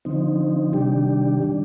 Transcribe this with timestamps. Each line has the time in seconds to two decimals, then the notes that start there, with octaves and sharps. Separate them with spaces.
0.05 D3 F3 C4 D#4
0.73 C3 D#3 G3 D4 G4
1.41 D#3 G3 D4